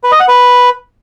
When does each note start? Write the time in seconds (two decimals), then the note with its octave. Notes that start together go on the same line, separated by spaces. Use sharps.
0.04 B4
0.12 D#5
0.20 F#5
0.28 B4